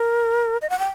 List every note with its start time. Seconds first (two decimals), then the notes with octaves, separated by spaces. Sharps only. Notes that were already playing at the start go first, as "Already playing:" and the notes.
Already playing: A#4
0.62 D#5
0.70 F#5
0.79 G5